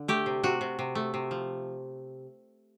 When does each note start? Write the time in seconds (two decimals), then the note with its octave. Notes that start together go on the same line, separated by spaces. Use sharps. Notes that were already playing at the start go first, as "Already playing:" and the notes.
Already playing: D3
0.08 A3 G4
0.26 C3
0.43 C3 F#4
0.61 C3
0.79 C3
0.95 A3
1.14 C3
1.31 F3